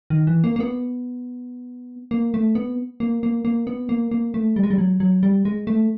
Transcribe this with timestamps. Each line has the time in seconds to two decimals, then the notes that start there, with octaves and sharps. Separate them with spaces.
0.10 D#3
0.27 E3
0.44 A#3
0.56 A#3
0.60 B3
2.11 A#3
2.34 A3
2.55 B3
3.00 A#3
3.23 A#3
3.45 A#3
3.67 B3
3.89 A#3
4.11 A#3
4.34 A3
4.56 G3
4.63 G#3
4.70 G3
4.78 F#3
5.00 F#3
5.23 G3
5.45 G#3
5.67 A3